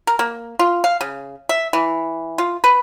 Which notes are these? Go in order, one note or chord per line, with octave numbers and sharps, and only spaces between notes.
A#4
A#3
F4
F5
C#3
E5
E3
F4
B4